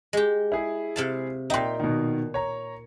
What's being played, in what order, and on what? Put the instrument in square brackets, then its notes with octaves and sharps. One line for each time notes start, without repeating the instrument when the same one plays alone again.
[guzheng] G#3 G4
[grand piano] E4 G#4
[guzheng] C3 F5 A5
[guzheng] A#2 D#4 [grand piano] E5 G5 C6
[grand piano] B2 D#3
C#5 A#5